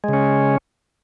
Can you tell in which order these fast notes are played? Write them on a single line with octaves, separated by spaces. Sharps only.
G#3 C#3 C#4